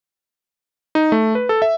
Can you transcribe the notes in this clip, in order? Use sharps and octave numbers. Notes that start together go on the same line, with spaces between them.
D#4
A3
B4
A4
E5